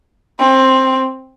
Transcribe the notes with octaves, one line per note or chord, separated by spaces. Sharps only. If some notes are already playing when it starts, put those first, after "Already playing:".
C4